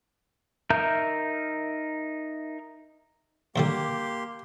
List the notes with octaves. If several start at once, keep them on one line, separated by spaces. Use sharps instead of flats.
D#4 A#4 E5 A#5 G6
D#2 D3 G3 A#3 G4 C6